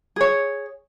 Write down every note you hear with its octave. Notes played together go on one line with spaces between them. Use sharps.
G#4 C#5